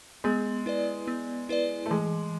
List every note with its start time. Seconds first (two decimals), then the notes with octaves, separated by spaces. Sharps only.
0.24 G#3 B3
0.66 E4 B4 D5
1.08 B3
1.49 E4 B4 D5
1.86 A3
1.91 E3 G#3